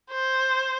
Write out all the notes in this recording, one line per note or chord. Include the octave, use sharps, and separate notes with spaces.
C5